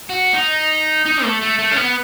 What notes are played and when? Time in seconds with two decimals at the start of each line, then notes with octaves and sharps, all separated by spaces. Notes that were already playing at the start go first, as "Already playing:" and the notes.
0.10 F#4
0.34 D#4
1.06 D#4
1.24 A3
1.41 A3
1.59 A3
1.71 C#4
1.77 B3